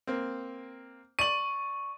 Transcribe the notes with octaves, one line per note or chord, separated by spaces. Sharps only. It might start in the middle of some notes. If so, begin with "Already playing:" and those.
A#3 C4
D5 C#6 D#7 F#7